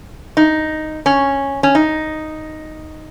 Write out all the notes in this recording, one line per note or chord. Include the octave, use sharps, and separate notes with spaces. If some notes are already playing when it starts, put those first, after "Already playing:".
D#4
C#4
C#4
D#4